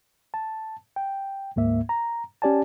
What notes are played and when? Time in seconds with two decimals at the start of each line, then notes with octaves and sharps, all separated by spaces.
0.34 A5
0.96 G5
1.56 D2 G#2 A#3 E5
1.89 A#5
2.42 C#4 G4 D5 G#5 A5